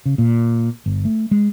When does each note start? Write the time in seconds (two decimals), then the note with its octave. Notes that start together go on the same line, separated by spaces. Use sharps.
0.06 C#3
0.18 A#2
0.86 G1
1.05 A3
1.31 G#3